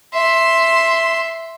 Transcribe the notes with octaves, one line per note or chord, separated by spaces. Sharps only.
E5 C6